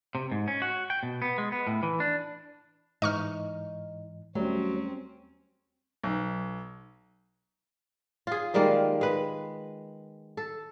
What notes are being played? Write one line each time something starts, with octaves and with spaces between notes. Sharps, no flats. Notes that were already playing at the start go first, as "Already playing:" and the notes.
C3
G#2
C#4
F#4
G5
B2
B3
G#3
B3
A2
E3
D4
G#2 E3 D#4 D#5 C#6 F6
D#2 F#3 G3 A3 C4 C#4
B1
F4 G#4
D#3 G3 G#3 A#3
G#3 B4
A4